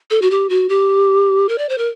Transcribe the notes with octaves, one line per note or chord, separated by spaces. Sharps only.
A4
F#4
G4
F#4
G4
A#4
D5
C5
A#4